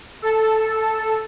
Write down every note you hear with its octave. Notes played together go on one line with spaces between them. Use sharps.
A4